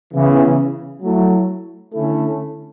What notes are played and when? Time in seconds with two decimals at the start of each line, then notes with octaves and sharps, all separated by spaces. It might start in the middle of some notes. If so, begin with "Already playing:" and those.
0.12 C#3 E3 B3
1.03 F#3 A3 E4
1.93 D3 A3 C#4 E4 A4